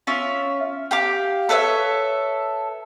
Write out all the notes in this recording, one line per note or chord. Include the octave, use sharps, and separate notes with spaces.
C#4 F4 E5
G4 F5 D6
A4 B4 C#5 E5